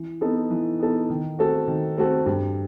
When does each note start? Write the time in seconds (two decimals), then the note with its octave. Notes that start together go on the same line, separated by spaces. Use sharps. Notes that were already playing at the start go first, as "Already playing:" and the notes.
Already playing: E3
0.21 B3 D#4 A4
0.50 E3
0.80 B3 D#4 A4
1.10 D#3
1.39 A3 C4 F#4 A4
1.67 D#3
1.97 A3 C4 F#4 A4
2.26 G2